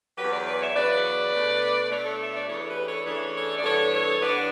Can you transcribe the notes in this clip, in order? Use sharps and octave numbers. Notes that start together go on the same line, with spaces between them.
E2 C#3 F#3 G4 B4
B4 D5
B4 D5
C#5 E5
E2 C#3 F#3 B4 D5
B2 A3 D4
B2 A3 D4 C#5
D5
A4 C#5
E5
D5
C#3 E3 A3 D4 A4 C#5
A4
G4 B4
A4 C#5
C#3 E3 A3 D4 A4 C#5
A4 C#5
D5
G2 E3 B3 D4 A4 C#5
A4 C#5
G2 E3 B3 D4 B4 D5
F#5